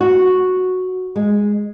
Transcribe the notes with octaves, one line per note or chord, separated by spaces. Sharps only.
F#4
G#3